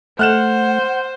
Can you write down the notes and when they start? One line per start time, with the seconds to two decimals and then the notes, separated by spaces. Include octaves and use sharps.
0.19 A3 C5 F#5 F6 F#6 E7